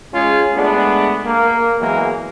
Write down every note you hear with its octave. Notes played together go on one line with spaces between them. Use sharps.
G#3 C#4 F4 G#4
G#3 A3 B3 D4
A#3
E2 E3 F#3 G#3 A#3